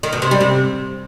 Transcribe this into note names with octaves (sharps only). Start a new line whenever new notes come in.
D#3
B2
C3
G3
C3